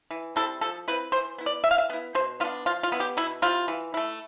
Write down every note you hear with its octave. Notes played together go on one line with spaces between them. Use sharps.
E3
G3 C4 E4 A4
F3 A4
C4 E4 B4
E3 C5
B3 E4
D5
E3 E5
F5
E5
B3 E4
B2 C5
B3 D4 F4
F3 F4
F4
B3 E4
G4
B2 E4
G3 C4 E4 F4
E3
A3 E4